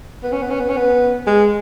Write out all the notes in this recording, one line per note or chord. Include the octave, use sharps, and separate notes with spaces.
B3
C#4
B3
C#4
B3
C#4
B3
G#3